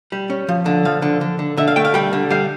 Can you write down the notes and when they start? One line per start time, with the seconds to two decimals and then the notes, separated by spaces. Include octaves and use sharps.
0.12 G3
0.30 C#4
0.49 F3
0.66 D3
0.85 F3 F5
1.02 D3
1.21 D3
1.39 D3
1.57 D3 E5
1.68 F5
1.76 A3 G5
1.85 F5
1.94 G3 G5
2.13 D3
2.31 G3 F5